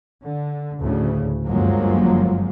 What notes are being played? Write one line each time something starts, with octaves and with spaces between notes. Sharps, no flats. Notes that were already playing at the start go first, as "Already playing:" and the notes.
D3
D2 A2 C#3
G1 F#2 F3 F#3 G#3 A#3